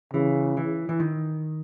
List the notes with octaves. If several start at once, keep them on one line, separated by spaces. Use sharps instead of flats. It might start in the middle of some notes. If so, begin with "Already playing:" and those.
C#3 E3
E3
E3
D#3